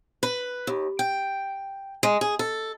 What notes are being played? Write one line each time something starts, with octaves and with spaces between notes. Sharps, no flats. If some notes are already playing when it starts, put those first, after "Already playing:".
B4
D#2
G5
G#3
G#4
A4